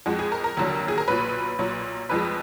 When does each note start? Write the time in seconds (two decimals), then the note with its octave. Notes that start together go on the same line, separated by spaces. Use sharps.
0.06 F2 F3 G#3 F#4
0.19 G#4
0.32 A#4
0.44 A#4
0.57 F1 D#2 D3 F#3
0.88 G#4
0.98 A#4
1.08 B1 A#2 F#3 B4
1.59 B1 A#2 F#3
2.09 F1 F2 F3 G#3 B4